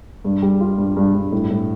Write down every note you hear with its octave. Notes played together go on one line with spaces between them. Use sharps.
G2
G3
F4
G2
G2
G2
A2
A2